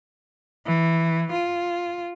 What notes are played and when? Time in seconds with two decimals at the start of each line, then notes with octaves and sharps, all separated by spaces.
0.66 E3
1.32 F4